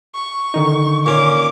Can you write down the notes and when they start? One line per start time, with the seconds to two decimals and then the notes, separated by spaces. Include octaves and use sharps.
0.15 C#6
0.54 D3 D#3 D#4
1.06 A#2 C#4 D6